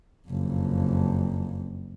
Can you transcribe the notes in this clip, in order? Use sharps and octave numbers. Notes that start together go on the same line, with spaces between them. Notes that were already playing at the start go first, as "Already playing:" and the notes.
F#1 F2